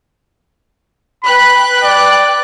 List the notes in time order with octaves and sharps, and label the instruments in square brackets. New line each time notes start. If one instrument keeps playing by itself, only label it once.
[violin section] B4 G5 F#6 [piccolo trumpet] B5
[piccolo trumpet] D5